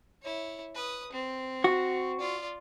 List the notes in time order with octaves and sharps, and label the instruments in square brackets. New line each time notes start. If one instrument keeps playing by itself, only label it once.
[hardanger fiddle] E4 C#5
B4 D#6
C4
[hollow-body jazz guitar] F#4
[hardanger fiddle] F4 D5